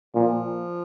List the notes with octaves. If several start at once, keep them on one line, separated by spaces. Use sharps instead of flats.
A#2 F3